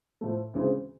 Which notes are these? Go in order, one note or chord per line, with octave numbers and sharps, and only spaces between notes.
A2 F3 A3
D2 C#3 E3 G#3 C4